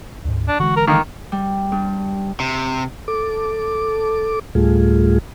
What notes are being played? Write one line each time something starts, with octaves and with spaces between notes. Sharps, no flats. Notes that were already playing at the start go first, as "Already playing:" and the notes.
D2 G#2
D4
D3 E3 G#3 F#4
A#4
D#3 A#3
G3
G2
C3
A4 D6
D2 A2 G3 A3 F4 G#4